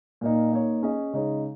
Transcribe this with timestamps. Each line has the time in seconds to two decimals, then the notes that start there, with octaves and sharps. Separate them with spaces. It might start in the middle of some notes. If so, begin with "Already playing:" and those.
0.21 A#2 A#3 D#4
0.53 A#3 D#4 C#5
0.83 C#4 G#4 D#5
1.13 C#3 G#3 D#4 C#5